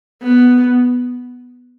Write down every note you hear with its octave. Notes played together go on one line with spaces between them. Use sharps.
B3